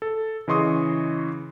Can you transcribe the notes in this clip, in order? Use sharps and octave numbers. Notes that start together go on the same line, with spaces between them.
A4
C#3 E3 D#5 C6 C#6 D#6